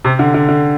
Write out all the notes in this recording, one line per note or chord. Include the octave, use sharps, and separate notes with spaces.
C3
D3
D3
D3